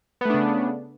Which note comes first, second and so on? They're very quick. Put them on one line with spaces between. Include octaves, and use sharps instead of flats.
B3 A3 D4 C#3